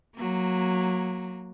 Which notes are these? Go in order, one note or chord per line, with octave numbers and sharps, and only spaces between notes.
F#3 A#3